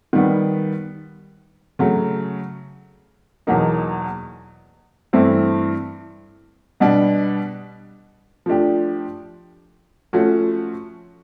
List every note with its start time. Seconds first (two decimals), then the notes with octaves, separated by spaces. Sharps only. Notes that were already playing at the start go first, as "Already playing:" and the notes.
0.13 D#3 G3 B3
1.79 C#3 F#3 A3
3.47 E2 B2 F#3 A#3 D#4
5.13 G2 E3 A3 C4 E4
6.80 B2 G3 B3 D4
8.46 F3 A3 D4 G4
10.13 F3 A3 C#4 F#4